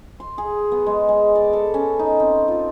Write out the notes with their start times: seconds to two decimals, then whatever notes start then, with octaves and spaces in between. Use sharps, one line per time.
0.20 C6
0.38 G#4
0.72 B3
0.86 G#3
1.09 G#3
1.35 D5
1.53 A4
1.74 C#4
1.99 D#4
2.20 C4
2.48 F4